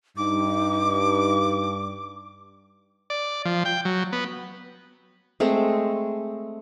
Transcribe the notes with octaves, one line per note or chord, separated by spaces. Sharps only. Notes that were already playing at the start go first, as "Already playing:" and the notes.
G2 D#4 D6
D5
F3
G5
F#3
B3
G#3 A3 C4